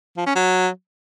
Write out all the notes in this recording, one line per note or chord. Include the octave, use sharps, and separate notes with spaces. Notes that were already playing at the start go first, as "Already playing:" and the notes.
F3
C#4
F#3